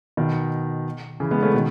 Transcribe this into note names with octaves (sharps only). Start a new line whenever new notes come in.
B2 D#3
C#3 E3
G#3 B3
A3 C#4
B2 D#3